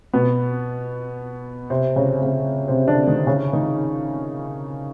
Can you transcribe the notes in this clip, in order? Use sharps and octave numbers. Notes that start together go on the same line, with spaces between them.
B2 B3
C3 C4
C#3 C#4
C#3 C#4
C3 C4
D3 D4
D#3 D#4
C#3 C#4
D#3 D#4